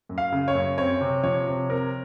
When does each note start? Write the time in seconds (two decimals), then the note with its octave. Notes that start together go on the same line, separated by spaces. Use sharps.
0.09 F#2
0.18 F5
0.32 C#3
0.48 C#5
0.55 F#2
0.78 C4 C#5
1.01 C3
1.23 F3 C#5
1.47 C3
1.69 C4 A#4